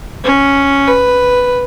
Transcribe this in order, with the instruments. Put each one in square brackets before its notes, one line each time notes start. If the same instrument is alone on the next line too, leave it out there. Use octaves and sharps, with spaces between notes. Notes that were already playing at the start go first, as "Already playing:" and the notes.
[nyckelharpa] C#4
B4